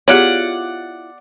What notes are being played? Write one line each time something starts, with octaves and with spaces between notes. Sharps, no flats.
B3 E4 F4 G4 G#4 C#5 D5 F#5